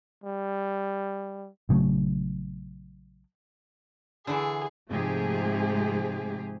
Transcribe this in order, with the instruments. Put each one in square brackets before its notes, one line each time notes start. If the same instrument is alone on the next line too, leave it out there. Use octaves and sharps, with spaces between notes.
[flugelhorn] G3
[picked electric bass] A#1 C#3 F#3 A3
[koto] D3 E3 [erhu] G#4
[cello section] G#2 C3 F3 A3 G4 G#4